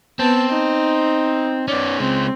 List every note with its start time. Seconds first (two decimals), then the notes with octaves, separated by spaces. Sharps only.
0.19 B3 C4 A5
0.50 D#4
1.68 B3 C#4 D5
2.00 C#3 G#3 C4